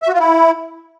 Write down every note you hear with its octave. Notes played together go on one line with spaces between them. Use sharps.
E5
F#4
F4
E4